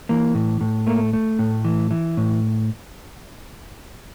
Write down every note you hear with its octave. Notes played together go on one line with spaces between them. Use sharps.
E3 A#3
A2
A2
A3 A#3
A3
A2
E3
E3
A2